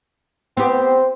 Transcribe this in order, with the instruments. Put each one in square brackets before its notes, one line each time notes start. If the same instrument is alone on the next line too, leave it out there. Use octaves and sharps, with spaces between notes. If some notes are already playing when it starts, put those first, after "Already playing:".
[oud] B3 G4 [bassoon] C4 [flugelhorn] C5